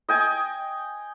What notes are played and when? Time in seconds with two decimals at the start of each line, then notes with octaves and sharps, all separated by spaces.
0.09 D#5 G5 G#5